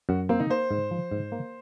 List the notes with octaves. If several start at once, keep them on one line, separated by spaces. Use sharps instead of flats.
F#2 F#4
A#3 C4
D#4
A#3 C5
G#2
F3
G#2
A#3